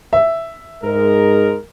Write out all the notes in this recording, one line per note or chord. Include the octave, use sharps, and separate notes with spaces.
E5
G#2 G#3 A#4